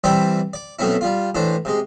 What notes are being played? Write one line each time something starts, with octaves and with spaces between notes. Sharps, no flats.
E3 G3 C4 C5 D5 E5
D5
B2 F#3 A3 C4 C#4 E4
G3 F4
A2 E3 D4 C5
C3 G#3